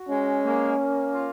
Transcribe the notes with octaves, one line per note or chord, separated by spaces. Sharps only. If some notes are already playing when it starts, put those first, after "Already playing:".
Already playing: F#4
G#3 C#4
A#3
A#3
F4